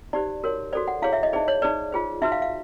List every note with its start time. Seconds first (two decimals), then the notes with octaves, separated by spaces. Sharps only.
0.13 D#4 G4 C5 D5
0.44 F#4 A#4 C#5
0.73 F#4 A4 C5 D5
0.88 F#5
1.02 E4 G#4 C#5 F5
1.13 E5
1.23 D#5
1.33 D#4 G#4 C5 D5
1.48 C#5
1.62 D#4 G#4 B4 D5
1.92 F4 G#4 C5
2.22 D#4 F#4 B4 E5
2.32 F5
2.42 F5